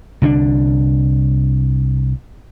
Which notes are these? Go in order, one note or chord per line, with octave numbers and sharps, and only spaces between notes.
C2 D3 C#4 D4